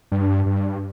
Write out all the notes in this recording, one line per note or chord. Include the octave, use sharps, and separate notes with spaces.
G2
G2